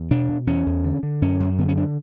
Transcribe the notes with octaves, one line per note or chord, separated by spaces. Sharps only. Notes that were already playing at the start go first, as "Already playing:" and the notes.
Already playing: E2
B2 D4
B2
E2 C#4
E2
D3
D3
F#2 C#4
F#2
D3 B3
C#4
D3 D4